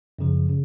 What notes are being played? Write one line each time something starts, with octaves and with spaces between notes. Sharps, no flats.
F#2 C#3 F3
C#3